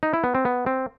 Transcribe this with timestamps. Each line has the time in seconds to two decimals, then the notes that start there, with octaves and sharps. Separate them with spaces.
0.03 D#4
0.14 E4
0.24 B3
0.35 C4
0.45 B3
0.66 C4